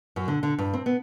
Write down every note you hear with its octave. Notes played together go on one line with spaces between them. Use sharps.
F#2
D3
D3
G2
C4
B3